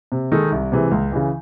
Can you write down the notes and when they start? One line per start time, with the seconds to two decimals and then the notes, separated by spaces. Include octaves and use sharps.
0.12 C3
0.32 D#3 G#3 D#4 A4
0.52 C2
0.72 C3 E3 G#3
0.91 C#2
1.12 C#3 E3